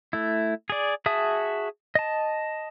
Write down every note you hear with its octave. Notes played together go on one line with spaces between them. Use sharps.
A3 E4
G#4 D5
F#4 G#4 E5 A5 D#6
D#5 A5